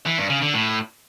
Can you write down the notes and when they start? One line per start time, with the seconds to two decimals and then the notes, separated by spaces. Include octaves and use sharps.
0.06 E3
0.18 G2
0.30 C#3
0.42 D3
0.54 A2